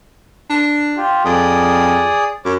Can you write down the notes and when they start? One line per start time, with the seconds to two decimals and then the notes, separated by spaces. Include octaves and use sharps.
0.50 D4
0.97 F4 G4
1.25 F2 G#4 D5 D#6
2.45 F#2 C#5 D6